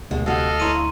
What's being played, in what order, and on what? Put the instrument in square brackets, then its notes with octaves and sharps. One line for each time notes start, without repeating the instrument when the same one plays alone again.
[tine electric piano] D2 [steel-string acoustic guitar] B2 G#3
[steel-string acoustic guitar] C3 F#4 [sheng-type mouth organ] A4 D#5 F5
[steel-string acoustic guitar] E4 C#5 [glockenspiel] A#5 C6 D#7